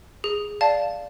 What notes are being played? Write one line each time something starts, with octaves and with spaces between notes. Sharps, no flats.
G#4
D5 F5 A5